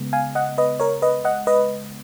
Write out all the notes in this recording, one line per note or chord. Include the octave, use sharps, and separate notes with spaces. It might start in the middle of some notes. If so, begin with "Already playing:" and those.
Already playing: C#3 G#3 B3
F5 G#5
D#5 F#5
B4 D#5
A#4 C#5
B4 D#5
D#5 F#5
B4 D#5